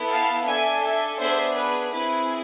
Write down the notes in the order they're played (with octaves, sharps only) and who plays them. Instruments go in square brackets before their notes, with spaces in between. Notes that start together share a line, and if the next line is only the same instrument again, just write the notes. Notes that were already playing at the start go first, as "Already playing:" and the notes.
Already playing: [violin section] B3 E4 A4
F5 A5
D4 A4 E5 G#5
E5 G#5
B3 D4 G#4 C5 E5
B4
C4 E4 G#4 B4